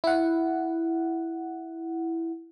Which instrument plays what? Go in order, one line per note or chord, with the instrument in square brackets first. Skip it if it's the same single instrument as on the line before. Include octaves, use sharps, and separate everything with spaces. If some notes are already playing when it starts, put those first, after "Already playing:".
[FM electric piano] E4 F#5